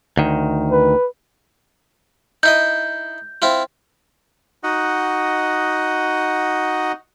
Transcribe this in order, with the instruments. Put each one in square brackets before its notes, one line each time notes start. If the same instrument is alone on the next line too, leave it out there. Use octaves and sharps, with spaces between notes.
[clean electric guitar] D2 D#3
[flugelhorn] B4
[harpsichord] D#4 E4 D#5 [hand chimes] G6
[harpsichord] C4 E4 F4
[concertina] D#4 F#4 D#5 F#5